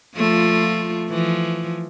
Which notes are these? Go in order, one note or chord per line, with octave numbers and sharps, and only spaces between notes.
F3 A3 F4
E3 F3